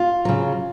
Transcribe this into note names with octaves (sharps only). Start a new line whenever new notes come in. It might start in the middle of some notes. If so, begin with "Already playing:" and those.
Already playing: F4
C#3 F#3